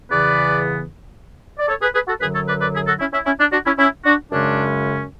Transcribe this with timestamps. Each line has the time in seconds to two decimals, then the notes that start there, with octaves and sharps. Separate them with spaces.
0.10 E2 C#3 E3 B3 B4 D5
1.59 D5
1.69 A4 C#5
1.82 G#4 B4
1.95 G#4 B4
2.08 F#4 A4
2.21 F#2 D3 F#3 G#4 B4
2.35 A4 C#5
2.48 B4 D5
2.61 B4 D5
2.74 E4 G#4
2.87 F#4 A4
3.00 C#4 E4
3.13 C#4 E4
3.26 C#4 E4
3.40 D4
3.53 D4 F#4
3.66 C#4 E4
3.79 C#4 E4
4.05 D4 F#4
4.32 F#2 C#3 G#3 C#4 D4